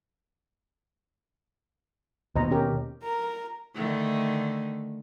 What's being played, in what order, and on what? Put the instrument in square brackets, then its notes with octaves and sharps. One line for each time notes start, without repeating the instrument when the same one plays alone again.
[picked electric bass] D#2 B2 [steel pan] C5 D#5 A#5
[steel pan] C#4 G4 A#4
[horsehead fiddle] A#4
[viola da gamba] D3 D#3 A3